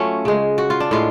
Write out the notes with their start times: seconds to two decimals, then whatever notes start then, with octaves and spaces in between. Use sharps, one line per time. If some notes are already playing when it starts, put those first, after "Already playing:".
Already playing: F#3 A3 C#4 F4
0.25 C#3 G#3
0.58 F#4
0.70 F4
0.80 D4
0.91 A2 G#3 F4